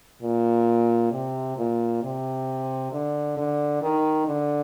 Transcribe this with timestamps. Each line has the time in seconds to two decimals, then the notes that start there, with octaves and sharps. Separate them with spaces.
0.22 A#2
1.12 C3
1.57 A#2
2.03 C3
2.92 D3
3.37 D3
3.82 D#3
4.27 D3